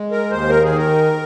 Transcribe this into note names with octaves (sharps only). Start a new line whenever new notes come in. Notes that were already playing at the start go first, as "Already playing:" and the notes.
Already playing: G#3
A#4
D#2 C5
A#4
D#3 G#4
A#4